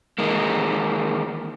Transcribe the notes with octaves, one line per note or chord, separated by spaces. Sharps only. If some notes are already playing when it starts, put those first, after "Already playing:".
E2 D#3 G#3 A#3